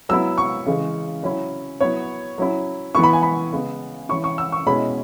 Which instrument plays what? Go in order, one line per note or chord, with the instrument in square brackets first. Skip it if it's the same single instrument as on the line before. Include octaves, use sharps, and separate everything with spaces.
[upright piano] F#3 B3 E4 E6
C#6
C#3 E3 G#3
F#3 C#4 E4
F#3 B3 E4 C#5
F#3 C#4 E4
E3 B3 E4 C#6
B5
G#5
B5
C#3 G#3 B3
E3 C#4 E4 C#6
C#6
E6
C#6
B2 G#3 C#4 E4 B5